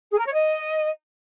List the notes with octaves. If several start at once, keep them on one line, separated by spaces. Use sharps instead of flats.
G#4
A#4
C#5
D#5